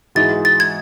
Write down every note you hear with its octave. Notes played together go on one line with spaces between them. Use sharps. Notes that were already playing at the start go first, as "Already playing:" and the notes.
G#2 E3 G#3 D#4 F#4 A6
A6
G#6